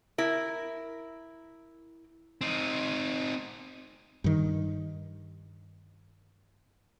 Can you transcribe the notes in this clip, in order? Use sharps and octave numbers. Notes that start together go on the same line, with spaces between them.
E4 A#4
C4 D#4
G2 D#3